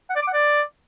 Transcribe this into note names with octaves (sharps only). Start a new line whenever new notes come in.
F#5
D5
D6
F#5
D5